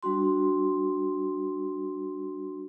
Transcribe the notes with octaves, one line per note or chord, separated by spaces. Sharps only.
G3 D4 F#4 C6